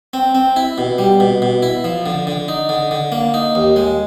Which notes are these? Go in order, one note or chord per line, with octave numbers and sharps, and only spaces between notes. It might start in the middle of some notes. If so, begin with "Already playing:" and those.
C4
C4
E4
B2
G3
B2
B2
E4
F3
D3
D3
D#4
D3
D3
A#3
D#4
D#2
G#3